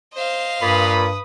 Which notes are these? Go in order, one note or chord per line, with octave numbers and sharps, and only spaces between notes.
C5 D#5 F5
G2 A#2 B4 B5 D#6